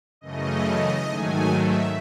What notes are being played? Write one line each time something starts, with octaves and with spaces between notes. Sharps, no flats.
F#2 C#3 E3 A3 D#5
G#2 D#3 F#3 A3 G#5
E5